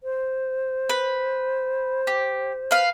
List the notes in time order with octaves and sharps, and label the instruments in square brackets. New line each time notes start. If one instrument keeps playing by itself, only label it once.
[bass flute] C5
[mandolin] B4
G4
B4 F5